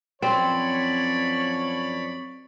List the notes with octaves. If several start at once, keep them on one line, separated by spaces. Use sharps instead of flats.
F#2 F3 C4 C#5 D5 B5